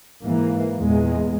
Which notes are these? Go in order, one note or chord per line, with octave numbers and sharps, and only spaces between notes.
G#2 E3 A#3
E2 A#2 G#3